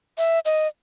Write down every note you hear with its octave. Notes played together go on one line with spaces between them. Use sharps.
E5
D#5